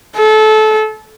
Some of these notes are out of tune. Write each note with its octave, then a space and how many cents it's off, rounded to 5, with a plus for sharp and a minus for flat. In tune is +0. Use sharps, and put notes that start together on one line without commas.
A4 -25